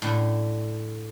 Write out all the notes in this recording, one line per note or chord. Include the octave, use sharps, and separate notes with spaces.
A2 D3